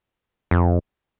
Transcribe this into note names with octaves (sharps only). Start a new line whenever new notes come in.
F2